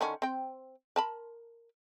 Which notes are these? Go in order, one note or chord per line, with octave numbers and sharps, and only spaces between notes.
D3 D#3 C#4
C4 G5
A#4 A5 B5